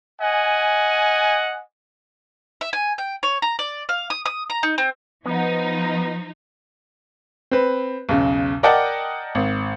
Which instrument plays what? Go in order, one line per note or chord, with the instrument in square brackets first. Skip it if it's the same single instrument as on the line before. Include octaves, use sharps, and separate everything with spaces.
[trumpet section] D#5 F#5 G#5
[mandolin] E5
G#5
G5
C#5
A#5
D5
F5
D#6
D#6
A#5
D#4
C4
[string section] F3 D#4 [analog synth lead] B3
[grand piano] C4 B4
B1 E2 C#3
A#4 D5 D#5 F#5 G5 A5
G#1